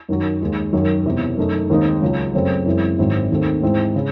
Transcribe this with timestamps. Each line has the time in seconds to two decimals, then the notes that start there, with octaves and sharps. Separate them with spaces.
0.09 F#2 D#3 F#3
0.41 D#2 D#3 G#3
0.73 F#2 D#3 F#3
1.06 E1 E2 C3
1.37 F#2 D#3 A3 D#4
1.70 D#2 D#3 G#3 C4 D#4
2.01 C#2 C#3 F#3
2.34 F#2 C#3 F#3 A3 C4
2.66 F#2 E3 G#3 C4
2.98 G#1 G#2 F#3 C4 E4
3.30 D#2 D#3 A3 C4
3.62 G#2 E3 G#3 C4 D#4
3.94 C#3 G#3